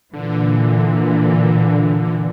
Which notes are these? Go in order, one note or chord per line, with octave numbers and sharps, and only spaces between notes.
A#2 D3 E3